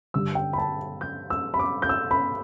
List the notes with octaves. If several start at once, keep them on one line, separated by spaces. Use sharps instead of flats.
G2 D3 G3 E6
G5
B5
A5
G6
E6
B5
D6
G6
E6
B5